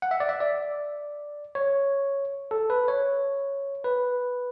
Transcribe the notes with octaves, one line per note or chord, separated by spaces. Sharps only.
F#5
E5
D5
E5
D5
C#5
A4
B4
C#5
B4